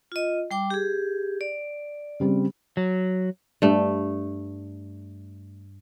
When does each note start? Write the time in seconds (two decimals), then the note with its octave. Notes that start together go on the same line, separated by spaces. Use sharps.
0.12 F4 D#5
0.51 G3 G5 D6
0.70 G4 G#4
1.41 D5
2.20 C#3 G3 C4
2.77 F#3
3.62 G2 A3